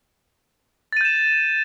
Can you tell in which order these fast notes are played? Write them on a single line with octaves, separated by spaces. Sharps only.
A6 D#7 G6 E7